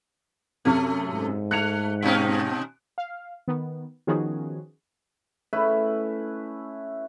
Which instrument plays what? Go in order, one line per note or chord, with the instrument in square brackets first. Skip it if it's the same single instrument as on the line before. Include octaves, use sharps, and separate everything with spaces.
[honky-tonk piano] F#2 C3 [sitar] A3
[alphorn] G#2
[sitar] A3 [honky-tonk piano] F#6 C#7 F7
[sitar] B2 C#4 D#4
[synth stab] F5
D#3 B3
D#3 F3 B3 C#4 F#4 G#4
[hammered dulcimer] A3 C#4 E4 B4